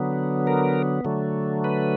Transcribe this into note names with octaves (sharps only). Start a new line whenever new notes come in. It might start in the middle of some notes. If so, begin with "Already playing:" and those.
Already playing: D3 F#3 B3
A#4
D3 F#3 A3
B4